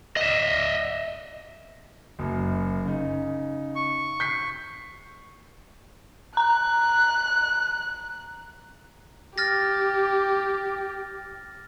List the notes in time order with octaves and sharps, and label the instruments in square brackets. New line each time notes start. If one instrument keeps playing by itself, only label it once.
[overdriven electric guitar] D#5 E5
[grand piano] F#1 F#2
C#3 D#4
[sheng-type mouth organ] C#6
[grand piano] G6 B6 C7
[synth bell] A#5 [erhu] F#6
[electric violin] G4 [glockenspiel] F6 A6 A#6